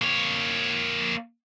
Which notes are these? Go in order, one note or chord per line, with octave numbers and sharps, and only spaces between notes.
A#3 C#5